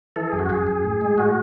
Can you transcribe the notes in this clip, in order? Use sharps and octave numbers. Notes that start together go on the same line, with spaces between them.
E3 A4
G#4
F#2
F#4
F#2 G#4
F#2
A2
G#3
A2 F#4